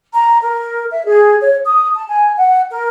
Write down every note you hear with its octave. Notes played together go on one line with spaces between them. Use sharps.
A#5
A#4
E5
G#4
C#5
D#6
A5
G#5
F#5
A#4